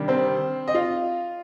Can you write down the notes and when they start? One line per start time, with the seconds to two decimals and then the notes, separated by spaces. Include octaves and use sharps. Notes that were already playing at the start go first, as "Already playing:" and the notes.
Already playing: C3 D#3 G3 D4
0.08 C4 C5
0.68 D#5
0.74 F4 F5